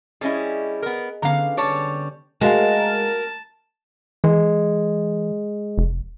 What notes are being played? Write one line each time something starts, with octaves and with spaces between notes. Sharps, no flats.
G3 C#4 E4 G#4 D#5
B3 A#4
D3 B3 C#4 F5 A#5
G3 C#5 A5 D6
G#3 F#4 A#4 F5 A5
E3 G#3
F1